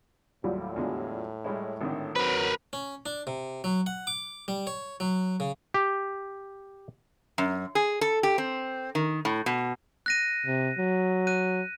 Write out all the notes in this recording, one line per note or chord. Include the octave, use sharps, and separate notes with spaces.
D#2 A2 F#3 G3 F4
E2 D3 G#3
G3 G#3 E4 C#5 E5
G#1 D3 D#3
F#3 C4 A#4 B4
C#4
D4
C3
F#3
F#5
D6
G3
C#5
F#3
C#3
G4
F#2
G#4
A4
G4
C4
D#3
A2
B2
F#6 A#6 D#7
C3
F#3
F#6 D#7